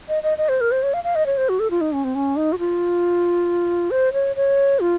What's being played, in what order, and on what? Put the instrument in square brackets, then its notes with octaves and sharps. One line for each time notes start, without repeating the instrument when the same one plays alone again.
[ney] D#5
D#5
D#5
C5
A#4
C5
C#5
F5
F5
D#5
C#5
C5
F#4
A4
F4
D#4
C#4
C4
C#4
D#4
F#4
F4
C5
C#5
C#5
F4